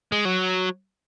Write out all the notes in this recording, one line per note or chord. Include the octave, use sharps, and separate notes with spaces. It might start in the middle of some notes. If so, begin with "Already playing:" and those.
G#3
F#3